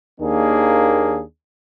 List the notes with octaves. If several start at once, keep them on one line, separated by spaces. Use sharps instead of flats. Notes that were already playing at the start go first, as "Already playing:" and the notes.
D#2 D#3 A#3 D4 G#4